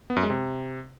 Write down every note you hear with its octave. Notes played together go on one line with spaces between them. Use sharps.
B3
F#2
G#3
C3